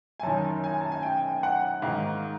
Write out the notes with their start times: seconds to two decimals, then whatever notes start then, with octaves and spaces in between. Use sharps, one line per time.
0.20 G#5
0.23 F#2 D#3 A5
0.64 G#5
0.81 A5
0.92 G#5
1.03 G5
1.43 F#5
1.82 G#2 D#3 F5